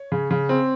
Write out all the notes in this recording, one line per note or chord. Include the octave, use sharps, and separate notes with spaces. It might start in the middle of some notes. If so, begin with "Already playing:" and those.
Already playing: C#5
C#3
C#3
C4